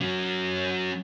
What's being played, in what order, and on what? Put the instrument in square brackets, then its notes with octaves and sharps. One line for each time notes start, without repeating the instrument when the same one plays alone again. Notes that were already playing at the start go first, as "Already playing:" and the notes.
[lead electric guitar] F#3 C#4